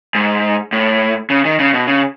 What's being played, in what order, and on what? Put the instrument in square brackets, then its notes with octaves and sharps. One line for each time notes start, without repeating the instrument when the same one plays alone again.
[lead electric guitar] G#2
A2
C#3
D#3
C#3
B2
C#3